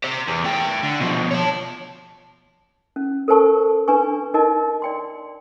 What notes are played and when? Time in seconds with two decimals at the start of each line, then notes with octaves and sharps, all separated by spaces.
0.04 G4 C5
0.27 E2
0.44 A3 G5
0.83 D3
1.00 B2 F3
1.31 C#5 A5
2.96 C#4
3.28 A4 A#4 C5 A5 C#6
3.88 D4 B4 G#5 C#6
4.34 D#4 A#4 D#5 A5
4.82 D5 G5 C6